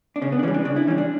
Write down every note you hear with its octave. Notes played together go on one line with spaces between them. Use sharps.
D4
C#3 C#4
B3
D4
E3 G3 C#4
D4
C#3 D4
E4
E3 G3 C#4
D4